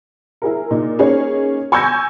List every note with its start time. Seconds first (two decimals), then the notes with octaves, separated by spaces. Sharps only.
0.42 E4 G#4 A#4
0.71 A#2 D#4
0.99 A#3 C#4 D#4 G#4 C#5
1.72 G#5 C#6 E6 G6 G#6 A#6